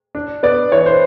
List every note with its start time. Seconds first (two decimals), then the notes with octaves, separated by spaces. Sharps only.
0.15 D4
0.43 B3 D5
0.72 E3 C#5
0.86 C5